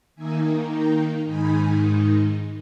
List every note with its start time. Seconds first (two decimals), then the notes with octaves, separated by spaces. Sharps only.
0.15 D#3 A#3 D#4 E5 G#5
0.70 G5 A#5
1.25 G#2 D#3 G#3 D#4 G#5 B5